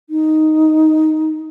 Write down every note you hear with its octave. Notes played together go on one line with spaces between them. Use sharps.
D#4